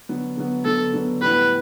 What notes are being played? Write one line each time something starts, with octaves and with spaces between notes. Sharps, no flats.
D3 F#3 B3
D3 F#3 B3
D3 F#3 B3 A4
D3 F#3 B3
A2 E3 G3 B3 B4